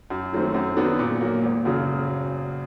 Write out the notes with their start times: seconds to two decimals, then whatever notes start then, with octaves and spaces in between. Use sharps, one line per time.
0.10 F#2
0.32 D#3 F#3 A3 C4
0.54 F#2
0.76 D#3 F#3 B3 D4
0.99 A#2
1.21 F#3 A#3
1.43 G#1
1.65 F#2 C#3 F#3